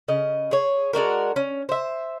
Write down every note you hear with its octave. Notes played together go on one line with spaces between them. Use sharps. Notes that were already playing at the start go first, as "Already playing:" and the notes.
C#3 D#5
G#4 C#5
G#3 D4 F#4 A#4
C#4
C5 E5